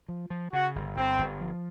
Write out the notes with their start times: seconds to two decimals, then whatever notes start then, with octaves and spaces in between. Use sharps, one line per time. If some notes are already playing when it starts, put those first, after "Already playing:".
0.08 F3
0.30 F3
0.53 C#3 F#4
0.76 G1
0.96 G1 C4
1.18 G1
1.41 F3